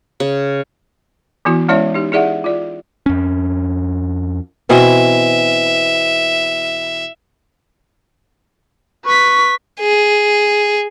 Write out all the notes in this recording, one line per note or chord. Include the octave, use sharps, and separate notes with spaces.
C#3
E3 B3 E4 F#4
G#3 C#4 E4 C#5 D5 E5
D#4 G4
E4 G#4 D5 E5 F#5
F4 D5
F2 C#4
B2 E3 C4 E5
B4 C#6 B6
G#4